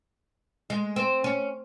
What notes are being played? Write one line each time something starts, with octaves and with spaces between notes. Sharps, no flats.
G#3
C4
C#4